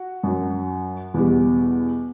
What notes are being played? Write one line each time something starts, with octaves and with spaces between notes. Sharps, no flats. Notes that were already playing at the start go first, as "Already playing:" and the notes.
Already playing: F#4
F#2 F#3
E2 B2 G3